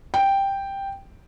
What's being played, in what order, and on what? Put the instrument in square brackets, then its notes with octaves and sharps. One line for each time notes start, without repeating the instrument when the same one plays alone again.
[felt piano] G5